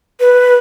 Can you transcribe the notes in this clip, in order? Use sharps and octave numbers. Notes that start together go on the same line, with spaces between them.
B4